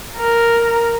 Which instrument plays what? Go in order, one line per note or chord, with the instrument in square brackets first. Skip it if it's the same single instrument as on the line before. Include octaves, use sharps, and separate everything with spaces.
[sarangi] A#4